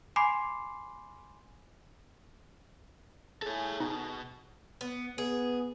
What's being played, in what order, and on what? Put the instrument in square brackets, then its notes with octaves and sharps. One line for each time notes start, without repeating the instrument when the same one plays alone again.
[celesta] G#5 B5 C6 D6 C7
[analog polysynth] G#4 [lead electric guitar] A4 C#5
[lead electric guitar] B2 [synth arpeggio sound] D#4
[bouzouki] B3
[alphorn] B3 [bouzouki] G#4